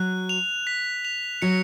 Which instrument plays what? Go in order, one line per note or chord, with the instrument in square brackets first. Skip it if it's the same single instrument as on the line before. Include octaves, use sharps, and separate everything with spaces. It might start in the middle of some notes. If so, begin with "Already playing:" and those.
Already playing: [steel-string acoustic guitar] F#3 [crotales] F#6
[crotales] F7
B6
F7
[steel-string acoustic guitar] F#3 [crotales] C#7